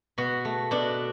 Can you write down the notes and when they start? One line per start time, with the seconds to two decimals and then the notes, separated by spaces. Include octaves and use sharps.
0.18 B2 F#4
0.45 A3
0.71 B2 D4